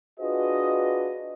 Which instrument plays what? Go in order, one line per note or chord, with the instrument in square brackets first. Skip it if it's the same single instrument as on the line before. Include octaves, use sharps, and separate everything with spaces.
[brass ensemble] D4 F4 F#4 G#4 B4 D#5